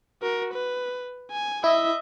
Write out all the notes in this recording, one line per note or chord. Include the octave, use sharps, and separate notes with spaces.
F#4 A#4
B4
G#5
E4 D#5 E5